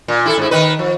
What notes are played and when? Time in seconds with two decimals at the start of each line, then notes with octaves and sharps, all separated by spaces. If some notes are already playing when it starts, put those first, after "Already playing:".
0.08 A#2
0.26 E4 G#4 A4
0.38 G#2 E4
0.51 D#3 D#4 B4
0.79 F3